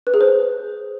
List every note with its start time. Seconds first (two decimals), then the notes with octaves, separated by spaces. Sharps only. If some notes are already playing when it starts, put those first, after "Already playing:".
0.07 B4
0.14 G#4
0.21 C5